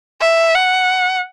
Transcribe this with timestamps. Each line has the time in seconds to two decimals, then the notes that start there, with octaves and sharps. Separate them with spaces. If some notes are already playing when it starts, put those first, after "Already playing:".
0.21 E5
0.55 F#5